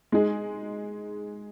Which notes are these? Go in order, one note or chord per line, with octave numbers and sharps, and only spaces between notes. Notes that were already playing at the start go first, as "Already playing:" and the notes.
G#3 D#4 G#4